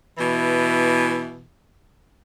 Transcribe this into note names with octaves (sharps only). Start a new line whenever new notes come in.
B2 E3